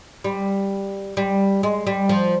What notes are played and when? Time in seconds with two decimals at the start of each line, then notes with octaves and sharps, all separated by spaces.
0.24 G3
1.17 G3
1.63 G#3
1.87 G3
2.09 F3